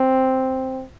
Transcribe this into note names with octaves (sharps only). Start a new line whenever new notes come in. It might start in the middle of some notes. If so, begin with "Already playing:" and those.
Already playing: C4